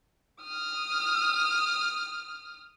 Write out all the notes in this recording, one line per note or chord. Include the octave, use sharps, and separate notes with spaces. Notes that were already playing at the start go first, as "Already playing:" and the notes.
D#6 F6